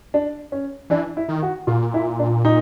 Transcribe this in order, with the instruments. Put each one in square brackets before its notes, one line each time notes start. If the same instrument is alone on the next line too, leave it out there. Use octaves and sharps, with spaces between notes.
[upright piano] D4
C#4
[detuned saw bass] E3 [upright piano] D4
[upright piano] E4
[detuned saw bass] D#3
[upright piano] F#4
[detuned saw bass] A#2 [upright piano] F4
[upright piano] E4
D4
D#4